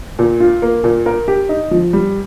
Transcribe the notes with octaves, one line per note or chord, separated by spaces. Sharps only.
A#2
F4
A#3
A#2
A#4
G4
D#4
F3
G3